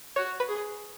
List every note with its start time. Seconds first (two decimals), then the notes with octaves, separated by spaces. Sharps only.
0.16 F#4 C#5
0.40 B4
0.48 G#4